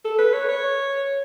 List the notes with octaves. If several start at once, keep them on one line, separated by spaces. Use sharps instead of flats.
A4
B4
C#5
C#5